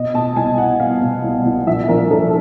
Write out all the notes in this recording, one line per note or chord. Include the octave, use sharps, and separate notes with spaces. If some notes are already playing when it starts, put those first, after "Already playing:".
Already playing: B2 D#5
B2 A5
C2 G#5
B2 F#5
B2 F5
B2
C2
C2
A#1 E5
A#1 A#4
E3 A4